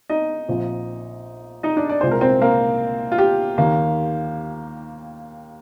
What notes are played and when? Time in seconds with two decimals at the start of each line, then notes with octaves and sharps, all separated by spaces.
0.10 D#4 D#5
0.48 A#1 A#2 F3 C4
1.63 D#4 D#5
1.77 D4 D5
1.90 D5
2.01 C2 A#2 G#3 C4 C5
2.11 A#4
2.21 C4 C5
2.42 A#3 A#4
3.12 F4
3.18 G4
3.58 D#2 D#3 A#3